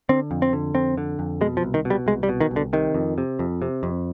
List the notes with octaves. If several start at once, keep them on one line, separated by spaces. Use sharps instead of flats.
D3 C4
F2
C4
D3
F2 C4
D3
F2
B2 G#3
F3
C2
D#3
B2
G3
C2 G#3
G3
B2
D#3
C2
D3
C3 D#3
F2
C3
F2
C3
F2